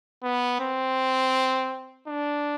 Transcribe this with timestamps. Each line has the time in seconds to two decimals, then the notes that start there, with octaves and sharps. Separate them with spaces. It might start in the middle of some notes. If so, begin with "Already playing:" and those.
0.23 B3
0.60 C4
2.08 D4